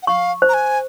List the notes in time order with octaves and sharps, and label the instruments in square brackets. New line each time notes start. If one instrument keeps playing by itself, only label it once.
[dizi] F#5
[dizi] F5 [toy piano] C#6
[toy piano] C5
[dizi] A#5
G#5